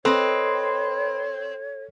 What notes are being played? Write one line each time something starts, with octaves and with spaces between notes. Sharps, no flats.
C4 A4 B4 C#5 D#5